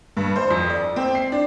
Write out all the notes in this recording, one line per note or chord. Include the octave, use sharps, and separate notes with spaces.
G2
C5
F2
D5
C4
C7
D4